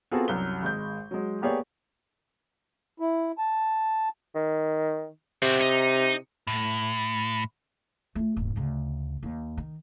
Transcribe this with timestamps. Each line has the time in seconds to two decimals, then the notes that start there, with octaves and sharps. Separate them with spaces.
0.11 B3 C4 F4 F#4 G#4 A4
0.28 C2 F#2 G7
0.62 G#1 G#3 G6
1.11 F#3 G#3
1.42 A#3 B3 G4 G#4 C#5 D5
3.00 E4
3.38 A5
4.35 D#3
5.42 C3 C4 F#4
5.61 D#4
6.47 A2
8.15 A3 F4
8.37 D#1 G#2
8.56 D2 C#3
9.23 D#2
9.58 D#3